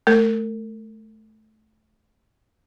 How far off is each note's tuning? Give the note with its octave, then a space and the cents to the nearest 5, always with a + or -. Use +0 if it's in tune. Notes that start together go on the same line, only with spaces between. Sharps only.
A3 -20 A#4 -40